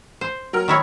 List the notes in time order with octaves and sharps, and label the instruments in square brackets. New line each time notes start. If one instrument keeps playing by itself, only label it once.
[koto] C5
[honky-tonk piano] F#3 A#4 F6
[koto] D#3 E4 C#5